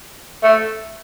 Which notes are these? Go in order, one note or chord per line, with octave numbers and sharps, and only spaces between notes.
A3